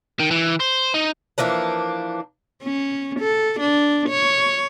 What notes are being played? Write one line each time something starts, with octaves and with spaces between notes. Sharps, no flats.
D#3
E3
C5
D#4
E3 F3 A#3 D4
C#4
A4
D4
C#5